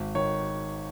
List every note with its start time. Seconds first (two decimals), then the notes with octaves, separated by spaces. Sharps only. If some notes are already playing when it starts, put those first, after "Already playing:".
Already playing: G#1
0.15 D#3 C#5